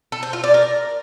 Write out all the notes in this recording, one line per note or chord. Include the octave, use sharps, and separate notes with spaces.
A4
C5
F4
D5
A#4